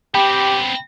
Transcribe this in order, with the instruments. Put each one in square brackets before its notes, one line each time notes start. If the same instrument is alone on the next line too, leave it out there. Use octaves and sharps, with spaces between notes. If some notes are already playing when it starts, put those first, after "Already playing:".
[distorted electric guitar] B3 C4 [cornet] G4 [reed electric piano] G5 B5